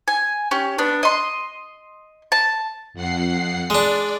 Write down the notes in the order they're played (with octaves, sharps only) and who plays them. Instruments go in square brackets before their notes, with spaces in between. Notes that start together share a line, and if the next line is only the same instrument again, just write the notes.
[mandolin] G#5
C#4 G4
B3 D4
D#5 C6
A5
[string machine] F2 F#5 C7
[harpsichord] G#3 D4 [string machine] D5